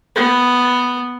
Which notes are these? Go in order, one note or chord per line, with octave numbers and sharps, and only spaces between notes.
B3